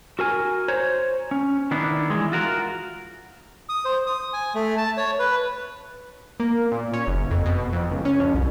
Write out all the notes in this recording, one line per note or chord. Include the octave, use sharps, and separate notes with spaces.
F#4 A#4 G#5
C5 C#5 G#5 A#5
C#4
D#3 B3 D4 E4
E3 G#3
F4 F#4 A#4
D#6
C5
D#6
G#5
A3
A5
C#5
B4
A#3
A#2
C#4
F#1
F2
B2
F2
C#2
C#4
F2
C2